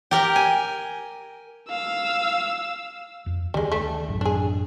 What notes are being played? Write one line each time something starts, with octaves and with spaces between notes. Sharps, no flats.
G4 A#4 G5
G#5
F5 E6
F2
D2 D#3 G3 G#3
A3
A1 F#2
D4 G#4